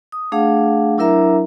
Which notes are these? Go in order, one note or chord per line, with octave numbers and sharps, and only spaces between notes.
D#6
A3 D4 G#4 F5 F#5
F#3 D4 E4 A#4 E5 A#5